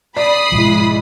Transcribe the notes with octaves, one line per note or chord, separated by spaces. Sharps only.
D5 B5 D#6 C7
G#2 B2 F3 G#3 E4